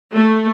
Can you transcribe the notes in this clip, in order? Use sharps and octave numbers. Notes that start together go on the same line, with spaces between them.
A3